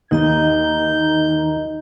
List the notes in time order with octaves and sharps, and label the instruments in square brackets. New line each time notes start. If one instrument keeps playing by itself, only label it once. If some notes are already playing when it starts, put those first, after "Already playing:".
[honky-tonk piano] D#2 [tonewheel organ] D#3 [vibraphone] D#4 D#5 A#5 [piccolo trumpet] G6